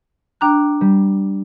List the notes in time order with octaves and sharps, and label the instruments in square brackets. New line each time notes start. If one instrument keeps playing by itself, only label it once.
[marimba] D4 A#5 [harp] G5 F#6
[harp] G3